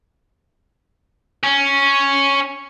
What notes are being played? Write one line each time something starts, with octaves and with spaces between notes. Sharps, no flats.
C#4